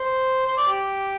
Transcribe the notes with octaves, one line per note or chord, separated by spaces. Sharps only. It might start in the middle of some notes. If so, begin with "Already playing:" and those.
Already playing: C5
C5
D5
G4